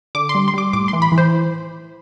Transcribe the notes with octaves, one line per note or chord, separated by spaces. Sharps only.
D3 D6
C6
G3
C6
G3 D6
A2 D6
C6
E3
B5
E3
C5